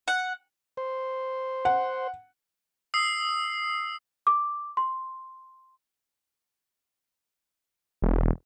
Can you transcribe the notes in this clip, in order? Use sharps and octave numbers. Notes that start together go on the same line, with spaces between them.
F#5
C5
F#5
D#6 E6 C7
D6
C6
E1